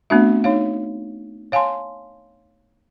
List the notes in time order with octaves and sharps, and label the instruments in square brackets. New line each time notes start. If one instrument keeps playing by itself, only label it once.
[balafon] A3 B3 C4 D4 F#4 E5
D#4 C#5 F5
C#5 F5 G#5 A5 C6